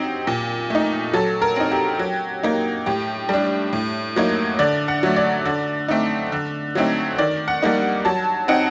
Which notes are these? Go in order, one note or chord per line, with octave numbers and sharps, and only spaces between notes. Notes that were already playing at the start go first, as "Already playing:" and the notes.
Already playing: F#3 C4 D#4 G4
A#2
A3 D#4
F#3 A4
A#4
C4 D#4
G4
F#3
A#3 D#4
A2 G4
G3 D4
A2
F#3 A#3 D#4
D3 D5
F#5
F#3 A3
D5
D3
A3 C4 D#4
D3
F#3 A3 C4 D#4
D#3 D5
F#5
G3 A#3 D#4
F#3 A5
C4 D#4 F#5